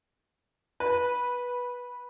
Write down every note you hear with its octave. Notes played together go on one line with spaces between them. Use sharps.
B4